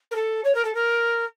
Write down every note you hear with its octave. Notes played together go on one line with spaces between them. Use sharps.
A#4
A4
C#5
A#4
A4
A#4